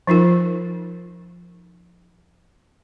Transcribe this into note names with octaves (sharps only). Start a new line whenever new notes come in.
F3 D#4 F4 A#4